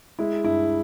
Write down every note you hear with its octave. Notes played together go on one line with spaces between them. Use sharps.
G#3 E4
G2 E4